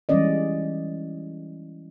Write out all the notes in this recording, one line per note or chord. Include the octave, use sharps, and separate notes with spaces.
E3 G3 G#3 C#4 D5 D#5